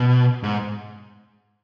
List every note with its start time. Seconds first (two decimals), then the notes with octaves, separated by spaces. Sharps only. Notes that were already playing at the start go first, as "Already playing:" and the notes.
Already playing: B2
0.43 G#2